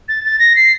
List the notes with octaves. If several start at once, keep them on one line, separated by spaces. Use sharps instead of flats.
A6
A6
A#6
C7